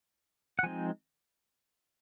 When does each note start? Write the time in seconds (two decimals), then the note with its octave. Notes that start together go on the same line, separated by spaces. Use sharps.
0.59 F#5
0.63 F3 G#3 C4 D#4 G#5